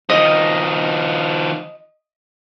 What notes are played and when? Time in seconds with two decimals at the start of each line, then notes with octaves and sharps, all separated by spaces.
0.10 D#3 F3 D#5